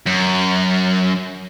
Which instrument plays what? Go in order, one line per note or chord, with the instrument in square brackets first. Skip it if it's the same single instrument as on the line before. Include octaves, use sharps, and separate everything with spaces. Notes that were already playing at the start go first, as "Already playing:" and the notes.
[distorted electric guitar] F#2